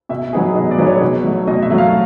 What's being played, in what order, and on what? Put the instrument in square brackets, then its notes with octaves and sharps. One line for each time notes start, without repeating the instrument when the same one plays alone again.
[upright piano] B2 [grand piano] E5
[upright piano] F#3 B3 D#4 G#4
[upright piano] B2 [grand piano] D#5
[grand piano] D5
[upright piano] F#3 B3 D#4 G#4
[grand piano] C#5
[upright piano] B2
F#3 A3
[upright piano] B2 [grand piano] D#5
[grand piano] E5
[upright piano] F#3 A3
[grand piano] F5